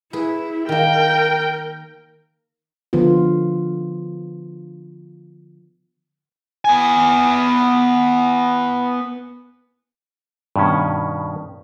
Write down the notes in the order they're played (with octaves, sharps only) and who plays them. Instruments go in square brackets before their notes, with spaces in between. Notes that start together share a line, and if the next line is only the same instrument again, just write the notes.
[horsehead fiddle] E4 [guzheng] G#4 B4
[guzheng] D#3 A#3 [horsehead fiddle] A#4 [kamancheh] G5
[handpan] D3 F3 B3 F4
[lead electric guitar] B3 G#5
[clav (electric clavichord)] G2 B2 D#3 C#4